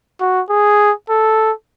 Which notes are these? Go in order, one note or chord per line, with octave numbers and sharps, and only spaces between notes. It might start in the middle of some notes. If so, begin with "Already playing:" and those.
F#4
G#4
A4